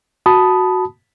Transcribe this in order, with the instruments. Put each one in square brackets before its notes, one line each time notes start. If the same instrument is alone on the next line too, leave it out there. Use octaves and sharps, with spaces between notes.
[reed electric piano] F#4 A5 B5 D#6